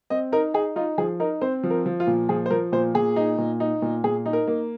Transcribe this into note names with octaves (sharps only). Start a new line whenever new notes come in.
C4 D#5
D#4 A#4
D#4 G#4
D#4 F4
F3 G#4
D#4 A#4
C4 C5
F3
A#4
F3
F4
A#2
F3 G#4
C5
F3 A#4
A#2 C5
A#2 G#4
D#4
A#2
D#4
A#2
A#2 G#4
D#4
A#4
A#3